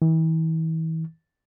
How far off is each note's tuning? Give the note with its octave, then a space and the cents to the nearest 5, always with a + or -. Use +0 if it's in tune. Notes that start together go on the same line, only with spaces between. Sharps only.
E3 -40